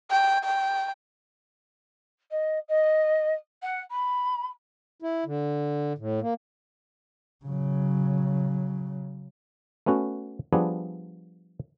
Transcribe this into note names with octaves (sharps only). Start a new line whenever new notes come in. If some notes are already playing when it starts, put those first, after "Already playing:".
G5
G5
D#5
D#5
F#5
B5
E4
D3
A2
A#3
C#3 F#3
A3 B3 C#4 F#4
F3 G3 B3 D4 G#4